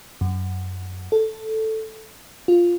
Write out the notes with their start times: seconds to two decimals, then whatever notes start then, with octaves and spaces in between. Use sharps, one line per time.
0.21 F#2
1.12 A4
2.48 F4